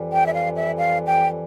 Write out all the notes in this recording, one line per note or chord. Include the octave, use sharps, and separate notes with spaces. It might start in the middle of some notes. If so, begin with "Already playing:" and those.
Already playing: F2 E3 G3
G5
E5
F5
E5
F5
G5